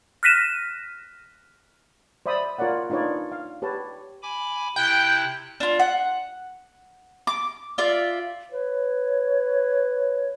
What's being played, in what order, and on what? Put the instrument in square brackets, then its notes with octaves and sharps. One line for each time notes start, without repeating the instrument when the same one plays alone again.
[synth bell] F6 F#6 A#6 B6 D#7 E7
[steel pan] C5 D5 E5 B5 D#6
F4 A#4 C#5 D5 F#5
D4 D#4 F4 B4 C#5 D5
F5
G4 B4 C#5 A5
[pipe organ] G#5 B5 D6
[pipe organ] C3 E4 F#6 [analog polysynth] G5
[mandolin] D4 F4
F#5
D6
F4 D5 E5
[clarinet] B4 [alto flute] C#5